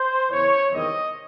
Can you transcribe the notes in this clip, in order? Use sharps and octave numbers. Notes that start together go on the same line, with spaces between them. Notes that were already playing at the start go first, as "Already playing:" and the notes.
Already playing: C5
E2 C#3 E3 C#5
E2 C3 D#3 G3 C4 D#5